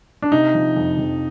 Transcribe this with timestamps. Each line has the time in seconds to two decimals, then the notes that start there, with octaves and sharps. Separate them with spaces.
0.22 D4
0.32 C3 D#4
0.55 F3
0.76 F2
0.98 F2